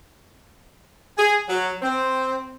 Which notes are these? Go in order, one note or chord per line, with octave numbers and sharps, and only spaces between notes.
G#4
F#3
C4